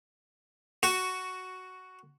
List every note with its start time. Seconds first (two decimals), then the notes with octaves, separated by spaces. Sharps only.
0.83 F#4